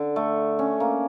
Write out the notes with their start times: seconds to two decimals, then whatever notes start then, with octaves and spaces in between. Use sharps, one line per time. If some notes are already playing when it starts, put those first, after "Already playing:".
Already playing: D3
0.16 A3
0.59 C#4
0.80 A#3